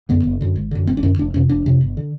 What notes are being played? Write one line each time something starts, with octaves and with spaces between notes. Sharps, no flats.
F#2 D3 B3
F#1
F#2 D3
G#1
F#2 D3
G#1 C4
D4
F#2 D3 C#4
F1 D4
F2 C3 C#4
F1 D4
F2 C3
G1
D3